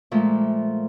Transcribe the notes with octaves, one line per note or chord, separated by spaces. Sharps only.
A#2 F3 G#3 A3